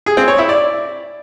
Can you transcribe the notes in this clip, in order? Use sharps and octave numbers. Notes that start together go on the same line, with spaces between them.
G#4
C4
C#5
E4
D5